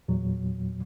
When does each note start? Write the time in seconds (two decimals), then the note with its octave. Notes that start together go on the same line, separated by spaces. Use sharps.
0.08 E2 A#2 F#3